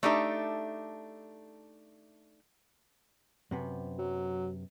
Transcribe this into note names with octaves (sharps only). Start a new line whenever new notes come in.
A3 D4 D#4 G4 A4 E5
F#2 C3 B3
F#3